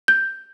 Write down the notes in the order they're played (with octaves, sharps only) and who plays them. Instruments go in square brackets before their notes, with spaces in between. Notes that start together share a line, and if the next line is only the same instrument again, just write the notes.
[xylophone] G6